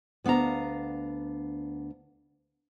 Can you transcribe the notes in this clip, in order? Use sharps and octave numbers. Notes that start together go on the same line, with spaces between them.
D2 B3 D4 F5 A#5